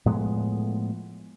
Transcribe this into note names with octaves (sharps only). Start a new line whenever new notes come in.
A2 F3 G#3 B3